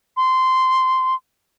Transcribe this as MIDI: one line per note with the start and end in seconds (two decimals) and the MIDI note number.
0.17 1.14 84